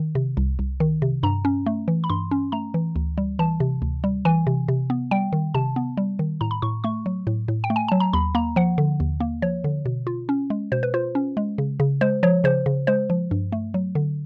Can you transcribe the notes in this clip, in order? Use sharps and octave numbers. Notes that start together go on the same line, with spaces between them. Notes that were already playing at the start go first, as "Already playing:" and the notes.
Already playing: D#3
C3
C2
C2
D#3
C3
G2 A#5
C#4
A3
E3
B5
G2 C6
C#4
A3 A#5
E3
D2
G3
E3 A5
C3
D2
G3
E3 G#5
C3
C3
B3
G3 G5
D#3
C3 A5
B3
G3
D#3
A2 A#5
B5
A2 C#6
A3 C#6
F#3
A2
A2
G5
A3
G#5
F#3 A5
A#5
D#2 B5
A#3 A#5
F3 F#5
D3
D#2
A#3
F3 C#5
D3
B2
F4
C#4
G#3
B2 C5
B4
F4 C5
C#4
G#3
C#3
C#3
G#3 C5
F3 C#5
C#3 C5
C#3
G#3 C5
F3
G2
A3
F#3
D3